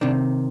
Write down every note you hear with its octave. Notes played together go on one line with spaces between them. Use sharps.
C3 D#3 D4